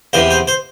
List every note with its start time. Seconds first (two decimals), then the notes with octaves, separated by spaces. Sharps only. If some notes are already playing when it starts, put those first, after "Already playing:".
0.13 E2 C3 E3 C5
0.31 C5
0.48 C5